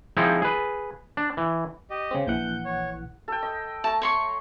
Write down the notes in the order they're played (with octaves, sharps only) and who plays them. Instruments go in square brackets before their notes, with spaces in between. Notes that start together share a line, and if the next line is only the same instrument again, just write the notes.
[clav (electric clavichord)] F3 G#3 C4 D#4 E4
G#4 B4
D4
E3
[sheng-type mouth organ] G4 D#5
[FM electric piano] C#3 G#3 C4
[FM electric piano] A#1 E3 F#5 [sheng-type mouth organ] G6
[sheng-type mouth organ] C#5
[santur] A4 G5
D#5
[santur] A3 A#5 [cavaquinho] A5
[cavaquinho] C#5 C6 C#6